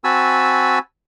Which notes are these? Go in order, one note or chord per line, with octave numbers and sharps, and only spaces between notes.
C4 F#4 G#5 A5 B5 E6